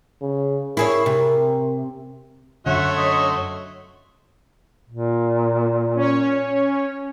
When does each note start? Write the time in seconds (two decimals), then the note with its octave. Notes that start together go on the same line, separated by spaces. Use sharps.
0.22 C#3
0.77 E4 G#4 A#4 C#5
1.06 C3
2.66 F#2 D3 A3 F#4 C#5 E5 F#5 C6
2.97 D#5
4.90 A#2
5.95 C#4 C#5